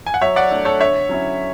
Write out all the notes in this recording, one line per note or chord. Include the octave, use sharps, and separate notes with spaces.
G#5
F#5
F#3 C#5 E5
D5 F#5
A3 D4
A4 C#5
D3 C#5 E5
F#3 C#4 E4